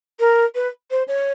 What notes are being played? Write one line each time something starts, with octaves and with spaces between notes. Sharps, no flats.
A#4
B4
C5
C#5